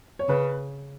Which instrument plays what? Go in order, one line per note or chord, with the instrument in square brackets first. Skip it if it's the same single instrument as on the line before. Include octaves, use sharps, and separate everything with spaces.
[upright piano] C#5
[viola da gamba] C#3 [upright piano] B4